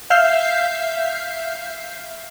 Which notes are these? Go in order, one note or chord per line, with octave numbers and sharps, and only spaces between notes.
E5 F5 F6 G6 C7